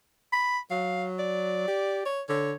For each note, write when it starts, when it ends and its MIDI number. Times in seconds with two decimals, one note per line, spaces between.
0.33 0.58 83
0.71 1.64 54
0.71 1.05 77
1.19 2.10 74
1.68 2.02 67
2.05 2.22 73
2.29 2.54 50
2.29 2.54 73